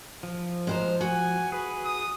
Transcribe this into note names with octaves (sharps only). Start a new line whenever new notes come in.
F3
G#3 C5 A#5
F#4 G#5
G#4 B4
D#6